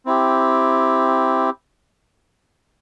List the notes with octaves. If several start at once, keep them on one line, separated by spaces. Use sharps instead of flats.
C4 E4 G4